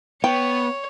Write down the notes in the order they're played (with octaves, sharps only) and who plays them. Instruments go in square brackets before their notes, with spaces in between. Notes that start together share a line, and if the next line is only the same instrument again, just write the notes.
[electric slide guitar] B3 [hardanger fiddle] C#5 [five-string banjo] G5